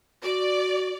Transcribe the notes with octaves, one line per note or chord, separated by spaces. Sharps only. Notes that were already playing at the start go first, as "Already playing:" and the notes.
F#4 D5